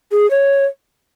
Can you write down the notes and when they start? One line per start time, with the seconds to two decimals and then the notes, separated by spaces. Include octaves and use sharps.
0.12 G#4
0.31 C#5